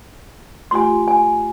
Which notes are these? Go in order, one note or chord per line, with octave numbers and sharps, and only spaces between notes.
A3 F4 G4 G#5 C6
G#5